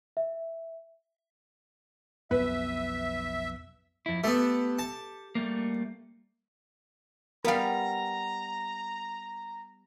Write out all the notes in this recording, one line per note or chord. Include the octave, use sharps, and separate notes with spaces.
E5
B1 F2 B3 B4 E5
F2 E4
A3 B3 G4 A4
A5
G3 A3 A#3
G3 B3 A#4 F5 A#5